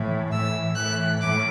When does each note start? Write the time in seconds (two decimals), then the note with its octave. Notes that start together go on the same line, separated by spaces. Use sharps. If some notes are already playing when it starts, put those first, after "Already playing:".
Already playing: A2 E3
0.31 A2 E3 E6
0.75 A2 E3 F#6
1.20 A2 D6